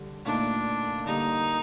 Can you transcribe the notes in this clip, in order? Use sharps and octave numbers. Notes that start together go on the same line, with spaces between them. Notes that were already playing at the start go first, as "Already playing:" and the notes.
Already playing: D3 G3 D4
A#2 A3 D4 D#4
D3 G3 A#3 D#4